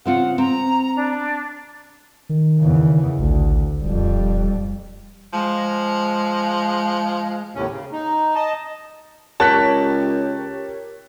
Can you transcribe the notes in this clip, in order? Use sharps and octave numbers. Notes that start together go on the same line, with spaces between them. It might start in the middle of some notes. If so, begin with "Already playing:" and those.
C#3 C4 F4 F#5
C4 A#5
D4
D#3
E2 C#3
A1 D2
D#1 F2 G3
F3 G#3
D#2 A2 C3 C#4
C#3
D#4
D#5 A5
C#2 G4 A#4 C#5 A5 F#6 B6